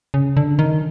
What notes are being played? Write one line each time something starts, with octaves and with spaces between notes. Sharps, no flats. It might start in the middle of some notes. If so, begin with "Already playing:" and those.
C#3
D3
D#3